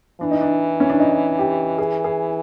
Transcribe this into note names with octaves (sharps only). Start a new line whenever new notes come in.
E3 D4
D#4
D4
C#4
D4
D#4
G4
G#4
G#4